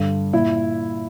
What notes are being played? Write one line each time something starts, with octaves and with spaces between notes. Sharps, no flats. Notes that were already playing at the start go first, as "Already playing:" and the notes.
Already playing: G2 D3
A#2 E4